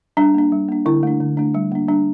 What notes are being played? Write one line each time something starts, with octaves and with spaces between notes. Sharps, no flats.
G3 D4
A#3 D4
G3
A#3 D4
D3 E4
A3 D4
D3
A3 D4
G3
A#3 D4
G3 D4